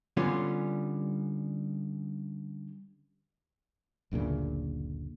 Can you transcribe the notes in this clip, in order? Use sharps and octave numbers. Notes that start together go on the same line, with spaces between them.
D3 G3 B3 C#4 F4
F#1 D2 A#2 C#3